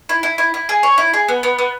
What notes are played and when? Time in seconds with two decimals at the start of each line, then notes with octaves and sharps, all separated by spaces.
0.09 E4
0.23 E4
0.38 E4
0.54 E4
0.69 G#4
0.83 C#5
0.98 E4
1.14 G#4
1.28 B3
1.43 B3
1.58 B3